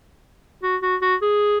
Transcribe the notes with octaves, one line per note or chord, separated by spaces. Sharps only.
F#4
F#4
F#4
G#4